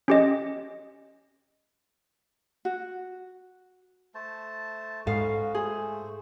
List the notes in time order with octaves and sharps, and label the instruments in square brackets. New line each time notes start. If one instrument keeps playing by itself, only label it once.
[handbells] C#4 G4 D#5
[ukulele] F#4
[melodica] A3 C5 A5
[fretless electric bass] G#2 [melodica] B3 C#4 F#4 [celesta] A4 [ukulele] F5
[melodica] A3 C5 [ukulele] G#4